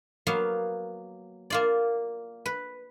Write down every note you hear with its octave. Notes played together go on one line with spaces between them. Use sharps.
F#3 A#3 B3 F5
A#3 F4 D5
B4